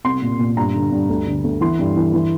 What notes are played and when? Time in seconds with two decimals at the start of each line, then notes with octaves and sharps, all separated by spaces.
0.04 C2 C6
0.22 A#2
0.39 A#2
0.56 G2 A#5
0.75 D3
0.92 G2
1.09 D2
1.26 D3
1.44 D2
1.61 E3 C6
1.79 G2
1.96 E3
2.13 E3